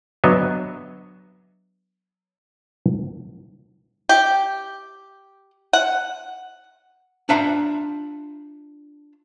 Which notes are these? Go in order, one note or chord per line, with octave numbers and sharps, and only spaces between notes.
F#3 B3 D4 C#5 D#5 E5
G4
F#5
D4 F4 E5 F#5 A#5